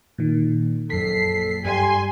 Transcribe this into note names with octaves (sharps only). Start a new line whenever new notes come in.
A#2 D#3
A#1 F#2 A4 B6 C7
G2 G3 G#5 C6